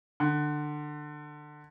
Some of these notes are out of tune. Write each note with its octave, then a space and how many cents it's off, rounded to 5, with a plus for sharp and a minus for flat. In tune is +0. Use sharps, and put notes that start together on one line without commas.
D3 +25